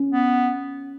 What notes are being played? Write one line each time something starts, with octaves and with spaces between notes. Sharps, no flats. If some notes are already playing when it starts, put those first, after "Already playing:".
Already playing: C#4
B3